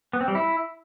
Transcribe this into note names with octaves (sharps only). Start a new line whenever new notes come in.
B3
C4
G3
E4